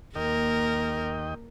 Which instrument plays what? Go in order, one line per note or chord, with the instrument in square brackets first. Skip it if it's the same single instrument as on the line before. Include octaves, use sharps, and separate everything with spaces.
[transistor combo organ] D#2 D#5 G5 [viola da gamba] A#3 A#4